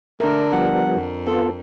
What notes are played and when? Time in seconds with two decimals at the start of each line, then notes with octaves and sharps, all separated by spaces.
0.20 D3 A3 D4 A#4
0.53 F3 G3 B3 F#5
0.93 F2
1.27 B3 F4 A4